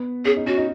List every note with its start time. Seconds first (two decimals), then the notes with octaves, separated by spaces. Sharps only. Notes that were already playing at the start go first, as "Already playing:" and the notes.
Already playing: B3
0.25 C#4 G#4
0.37 D#4
0.46 C#4 F#4
0.58 D#4